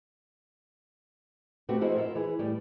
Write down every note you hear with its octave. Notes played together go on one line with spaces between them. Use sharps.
A3 C4 F#4 G4 B4
F3 E4 F#4 G#4 C5 D#5
E4 F4 A#4 D#5 E5
E3 G#4 B4
A2 G3